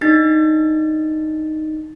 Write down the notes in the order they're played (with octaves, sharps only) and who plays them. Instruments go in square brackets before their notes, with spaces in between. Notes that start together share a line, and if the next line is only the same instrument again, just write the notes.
[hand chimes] D4 D#4 A6